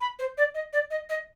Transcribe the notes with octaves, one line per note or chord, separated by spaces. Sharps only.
B5
C5
D5
D#5
D5
D#5
D#5